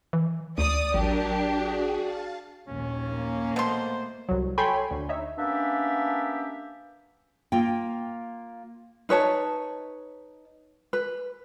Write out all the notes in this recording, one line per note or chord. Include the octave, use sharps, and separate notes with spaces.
E3
D2 D5 D#6
A1 F#3 D4 G4 A#4
F#4 G#4
F5 A5
A#1 D#2 C#4
A#3
B2 A3 B3 C5 C6
C2 F#3
A4 C#5 G5 G#5 B5 C6
D2
D#4 C#5 E5
A#3 B3 C#4 D4 G4 E5
A#3 F4 G5
D#4 B4 C#5 A5
B4